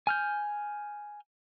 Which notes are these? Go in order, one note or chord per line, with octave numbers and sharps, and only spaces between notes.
G#5 F6 G6